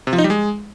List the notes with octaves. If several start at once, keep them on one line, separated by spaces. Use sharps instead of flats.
C3
F3
D#4
G3
G#3